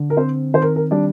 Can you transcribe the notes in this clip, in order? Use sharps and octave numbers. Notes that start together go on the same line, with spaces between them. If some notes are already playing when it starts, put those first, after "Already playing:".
Already playing: D3
A#4
C4 C5
D#3 C5
A#4
A#4
G3 D4 D5